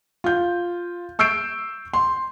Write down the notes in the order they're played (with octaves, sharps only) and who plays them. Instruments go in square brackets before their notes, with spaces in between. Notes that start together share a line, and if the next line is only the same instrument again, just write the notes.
[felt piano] F4 G6
C#6 E6 G6 C7 D7
C6